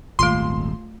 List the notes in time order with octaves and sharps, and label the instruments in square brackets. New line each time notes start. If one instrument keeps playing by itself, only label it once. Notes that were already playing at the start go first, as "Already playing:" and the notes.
[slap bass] D#1 G#1 [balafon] A3 F4 [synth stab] C6